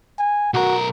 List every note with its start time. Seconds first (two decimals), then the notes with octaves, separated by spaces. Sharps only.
0.19 G#5
0.54 B1 F#4 A#4